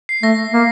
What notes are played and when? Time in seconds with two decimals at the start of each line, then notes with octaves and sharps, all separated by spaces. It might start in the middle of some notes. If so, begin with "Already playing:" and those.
0.09 C7
0.23 A3 A#6
0.54 A#3